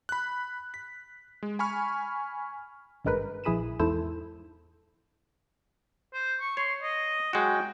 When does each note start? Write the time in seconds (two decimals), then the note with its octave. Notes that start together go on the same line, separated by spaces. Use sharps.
0.09 B5 F#6
0.74 B6
1.43 G#3
1.59 G#5 B5 C#6 F6
3.05 G#1 G2 G#3 A#4 B4 B5
3.44 A#1 E4 G#4 B5 D#7 E7
3.80 E2 G#2 E4 A4 C5 E7
6.14 C5
6.41 C#6
6.57 C#5 C6
6.82 D#5
7.33 F#3 G#3 F#4 G5